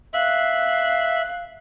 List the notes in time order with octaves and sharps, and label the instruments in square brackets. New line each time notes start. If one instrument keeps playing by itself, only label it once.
[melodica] E5 [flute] F5 [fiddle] F#6